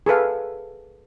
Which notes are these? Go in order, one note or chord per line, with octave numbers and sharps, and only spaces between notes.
G#4 A4 B4 F5